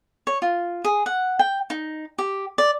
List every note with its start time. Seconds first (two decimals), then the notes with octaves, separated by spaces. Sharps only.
0.27 C#5
0.42 F4
0.84 G#4
1.06 F#5
1.39 G5
1.70 D#4
2.18 G4
2.58 D5